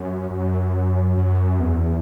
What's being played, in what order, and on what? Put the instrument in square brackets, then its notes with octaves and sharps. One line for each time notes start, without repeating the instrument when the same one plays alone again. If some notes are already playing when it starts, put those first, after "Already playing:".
Already playing: [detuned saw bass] F#2
F#2
F#2
E2